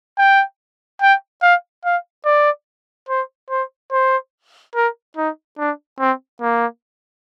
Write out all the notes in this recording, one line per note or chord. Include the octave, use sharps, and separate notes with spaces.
G5
G5
F5
F5
D5
C5
C5
C5
A#4
D#4
D4
C4
A#3